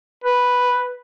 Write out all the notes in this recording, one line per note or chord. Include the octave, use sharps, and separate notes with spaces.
B4